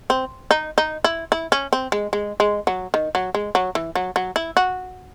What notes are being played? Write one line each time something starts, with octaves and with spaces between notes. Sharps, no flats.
C4
D#4
D#4
E4
E4
C#4
C4
G#3
G#3
G#3
F#3
D#3
F#3
G#3
F#3
E3
F#3
F#3
E4
F#4